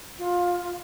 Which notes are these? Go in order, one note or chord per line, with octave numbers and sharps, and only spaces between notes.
F4